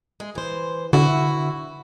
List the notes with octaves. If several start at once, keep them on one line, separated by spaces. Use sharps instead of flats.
G#3
E3 C5
D3 E4 F#4